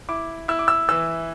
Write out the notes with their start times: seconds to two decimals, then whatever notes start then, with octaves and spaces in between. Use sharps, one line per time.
0.09 E4 D6
0.48 E4 E6
0.59 D6
0.68 E6
0.89 E3 E6